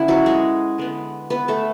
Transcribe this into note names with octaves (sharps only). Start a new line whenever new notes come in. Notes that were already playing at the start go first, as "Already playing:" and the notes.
Already playing: D3 B3 C#4 E4
F#3 F#4
G#3 G#4
D3 G#3 B3
B3 B4
A3 A4